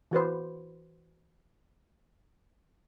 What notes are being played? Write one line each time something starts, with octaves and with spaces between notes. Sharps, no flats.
E3 F#4 B4 C5